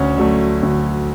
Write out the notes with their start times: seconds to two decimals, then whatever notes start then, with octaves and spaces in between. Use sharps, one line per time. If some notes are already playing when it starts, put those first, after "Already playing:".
Already playing: D2 C#4 C#5
0.17 D3 F#3 A3
0.63 D2